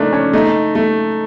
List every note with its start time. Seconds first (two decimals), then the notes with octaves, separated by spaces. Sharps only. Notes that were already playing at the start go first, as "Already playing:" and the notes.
Already playing: C#3 F3 A3 A#3 D4 D#4
0.13 C#4
0.33 A3 D#4
0.75 A3